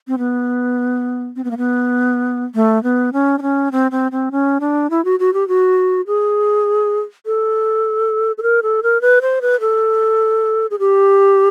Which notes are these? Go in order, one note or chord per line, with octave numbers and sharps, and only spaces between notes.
C4
B3
C4
B3
A#3
B3
A3
B3
C#4
D4
C#4
C4
C4
C4
C#4
D4
E4
F#4
F#4
G4
F#4
G#4
A4
A4
A#4
A4
A#4
B4
C5
B4
A4
G#4
G4